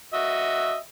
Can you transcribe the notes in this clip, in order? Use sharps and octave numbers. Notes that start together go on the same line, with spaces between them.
F#4 D#5 E5